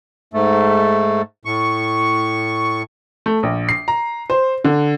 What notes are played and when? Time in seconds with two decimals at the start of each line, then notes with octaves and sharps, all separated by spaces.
0.34 G#2 A3
1.45 A2 C#6
3.26 A3
3.43 A#1
3.69 C7
3.88 A#5
4.30 C5
4.64 D3